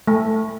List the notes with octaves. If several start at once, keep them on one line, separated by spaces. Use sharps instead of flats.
A3